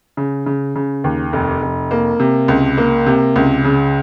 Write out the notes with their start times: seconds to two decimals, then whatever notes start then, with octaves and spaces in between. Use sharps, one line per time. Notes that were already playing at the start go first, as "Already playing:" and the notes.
0.17 C#3
0.46 C#3
0.76 C#3
1.04 D#2
1.33 F1
1.62 F1
1.91 A#3
2.20 C3
2.48 C#2
2.78 A#3
3.06 C3
3.36 C#2
3.64 C#3